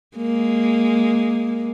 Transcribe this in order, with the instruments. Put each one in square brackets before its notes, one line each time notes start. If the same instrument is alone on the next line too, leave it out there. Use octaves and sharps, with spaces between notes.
[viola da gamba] G#3 A#3